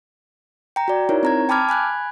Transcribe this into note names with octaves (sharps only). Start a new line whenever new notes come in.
G5 A#5
F#4 D5
D#4 E4 A#4 C#5
C4 A#5 G#6
G5 A5 B5 D6 F6 G#6
G#5 B5 F#6 G#6